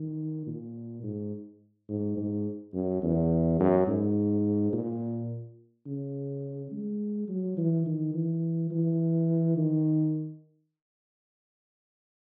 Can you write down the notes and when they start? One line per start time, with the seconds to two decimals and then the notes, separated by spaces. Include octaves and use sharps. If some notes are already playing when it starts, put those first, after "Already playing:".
Already playing: D#3
0.47 A#2
1.03 G#2
1.89 G#2
2.17 G#2
2.74 F#2
3.02 E2
3.60 F#2
3.87 G#2
4.73 A#2
5.86 C#3
6.72 G#3
7.28 F#3
7.57 E3
7.86 D#3
8.14 E3
8.70 E3
9.57 D#3